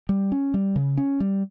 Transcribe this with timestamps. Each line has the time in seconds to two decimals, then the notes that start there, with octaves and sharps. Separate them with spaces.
0.09 G3
0.32 C#4
0.54 G3
0.76 C#3
0.97 C#4
1.20 G3